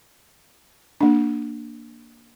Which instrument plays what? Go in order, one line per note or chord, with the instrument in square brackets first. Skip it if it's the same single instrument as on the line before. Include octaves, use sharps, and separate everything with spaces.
[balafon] A#3 D4